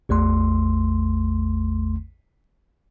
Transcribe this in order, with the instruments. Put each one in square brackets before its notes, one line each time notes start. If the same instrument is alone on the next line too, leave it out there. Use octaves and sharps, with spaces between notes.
[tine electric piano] A1 E2 A3 C6